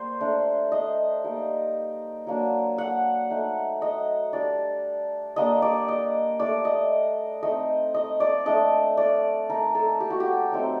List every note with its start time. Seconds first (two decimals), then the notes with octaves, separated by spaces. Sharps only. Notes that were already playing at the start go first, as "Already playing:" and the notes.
Already playing: G3 A#3 C5
0.21 A3 D4
0.72 D#5
1.24 G3 A#3 D#4
2.27 F#3 A#3 D4
2.78 F#5
3.30 A3 D#4
3.82 D#5
4.33 G3 D4 D5
5.36 G3 A#3 D4 D#5
5.62 D5
5.88 D#5
6.39 A3 D4 D5
6.65 D#5
7.43 A3 C4 D#4 D#5
7.94 D#5
8.20 D5
8.46 A3 D4 D#5
8.97 D5
9.49 A3 D#4 A#4
9.75 A4
10.00 G4
10.10 F#4
10.20 G4
10.52 F#3 A3 C4 D#4